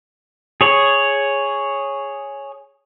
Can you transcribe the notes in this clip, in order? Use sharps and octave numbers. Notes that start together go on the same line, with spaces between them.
G#4 C#5